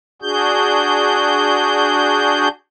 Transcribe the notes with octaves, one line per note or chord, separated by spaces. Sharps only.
D4 F#4 G#4 G6